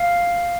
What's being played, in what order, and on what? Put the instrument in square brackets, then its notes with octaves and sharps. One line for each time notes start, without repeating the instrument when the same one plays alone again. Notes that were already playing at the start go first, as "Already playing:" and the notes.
Already playing: [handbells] F5